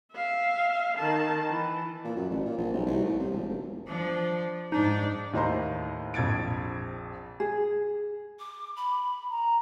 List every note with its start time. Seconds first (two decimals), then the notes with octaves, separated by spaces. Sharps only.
0.13 E5 F5
0.98 D#3 A5
1.51 E3
2.04 A#2
2.16 F#2
2.30 A1
2.45 A#2
2.58 A#1
2.73 B1
2.86 C2
3.05 A2
3.19 C3
3.31 E1
3.49 F1
3.87 F3 D4
4.72 G#2 D4 D#4
5.33 D#2 A2 D#4 C5 A#5 C6
6.14 A#1 F2 G#6 A6 D7
7.40 G#4
8.39 D6
8.76 B5
9.31 A#5